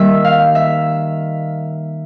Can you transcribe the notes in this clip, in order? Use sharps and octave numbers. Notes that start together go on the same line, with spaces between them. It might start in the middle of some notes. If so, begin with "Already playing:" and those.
Already playing: D#3 G3 A#3 E5
F5
E5